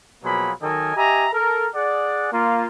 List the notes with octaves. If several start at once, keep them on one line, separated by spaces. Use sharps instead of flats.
B2 F3 F#3 A#3 G#4 B5
D#3 F#3 A4 A#4 D#5 G#5
G4 D#5 E5 G#5 A#5
A4 A#4
G#4 D5 F#5
A#3 F4